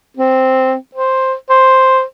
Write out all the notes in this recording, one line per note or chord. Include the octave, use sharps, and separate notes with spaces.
C4
C5
C5